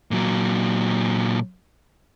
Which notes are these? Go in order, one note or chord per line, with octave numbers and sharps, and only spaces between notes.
A#2 F#3